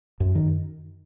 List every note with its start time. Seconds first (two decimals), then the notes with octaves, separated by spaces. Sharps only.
0.20 F#2
0.35 D#3